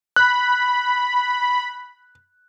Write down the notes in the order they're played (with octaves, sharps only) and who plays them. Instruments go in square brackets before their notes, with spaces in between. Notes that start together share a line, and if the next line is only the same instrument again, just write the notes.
[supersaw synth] B5 [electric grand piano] F#6